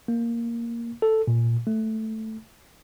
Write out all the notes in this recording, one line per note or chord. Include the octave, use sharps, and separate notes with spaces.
A#3
A4
A#2
A3